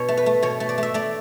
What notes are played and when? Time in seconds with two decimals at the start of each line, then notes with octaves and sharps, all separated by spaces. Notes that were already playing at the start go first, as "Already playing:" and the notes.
Already playing: B2 C#5
0.08 A3
0.17 B4
0.26 A3
0.42 B2 C#5
0.60 A3
0.69 D5
0.78 A3 E5
0.94 A3 D5